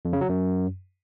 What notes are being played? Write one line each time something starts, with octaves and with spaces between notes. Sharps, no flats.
F2
C#3
F#3
F#2